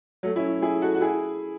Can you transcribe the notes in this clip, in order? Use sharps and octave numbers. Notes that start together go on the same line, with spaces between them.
F#3 A3
C#4 E4
E4 G#4
F#4 A4
F#4
E4 G#4